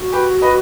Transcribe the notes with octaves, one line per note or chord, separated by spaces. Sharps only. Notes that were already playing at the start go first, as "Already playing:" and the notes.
Already playing: F#4
G4 B4
B4 D#5